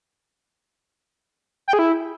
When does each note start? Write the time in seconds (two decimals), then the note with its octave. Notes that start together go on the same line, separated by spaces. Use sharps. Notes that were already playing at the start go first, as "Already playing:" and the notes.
1.68 G5
1.73 G#4
1.79 E4